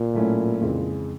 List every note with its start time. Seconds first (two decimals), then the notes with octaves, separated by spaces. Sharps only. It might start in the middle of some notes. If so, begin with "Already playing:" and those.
Already playing: A#2
0.14 A2 F#3 A3 C#4 E4
0.61 F2 C#3 E3 G#3